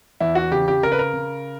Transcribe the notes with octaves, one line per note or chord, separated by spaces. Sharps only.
E2 E4
F#4
C#3 G4
G4
C#3 A#4
B4
A#4
C#3